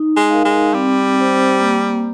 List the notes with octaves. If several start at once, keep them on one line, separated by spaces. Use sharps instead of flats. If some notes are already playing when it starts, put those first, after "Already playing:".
Already playing: D#4
G#3
A#4 F5
G#3
G3 C4
G4 C5
A#3